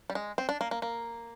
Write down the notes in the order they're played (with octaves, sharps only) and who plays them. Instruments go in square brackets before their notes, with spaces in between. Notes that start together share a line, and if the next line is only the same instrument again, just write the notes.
[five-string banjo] G3
G#3
C4
D4
A#3
A#3
A#3